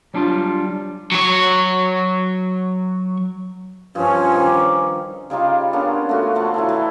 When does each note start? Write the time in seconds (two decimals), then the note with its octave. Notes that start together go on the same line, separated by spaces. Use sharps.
0.14 F#3 G3 D4 D#4 F4
1.12 F#3 C#5
3.95 G2 F3 C#4
4.32 D#3 D6
5.30 C#3 G3 D#4 F4
5.73 A#3 B3 C#4 D4
6.09 A3 F4 F#4
6.35 F3 A3
6.54 E3 F#3 E4
6.69 E3